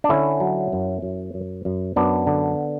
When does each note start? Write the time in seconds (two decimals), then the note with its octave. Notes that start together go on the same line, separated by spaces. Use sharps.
0.04 D4
0.09 D3 C#4 E4
0.40 F#3
0.73 F#2
1.02 F#2
1.34 F#2
1.65 F#2
1.96 F#2 B3 D4
2.27 D3